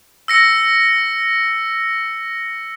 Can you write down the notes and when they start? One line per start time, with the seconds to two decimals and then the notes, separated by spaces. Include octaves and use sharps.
0.28 E6 A#6 C#7